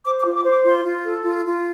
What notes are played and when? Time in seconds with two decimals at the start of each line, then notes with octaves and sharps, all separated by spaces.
0.05 C5 D6
0.20 D6
0.25 F4
0.35 D6
0.45 C5 D6
0.65 F4 C6
0.85 F4
1.04 A4
1.24 F4
1.44 F4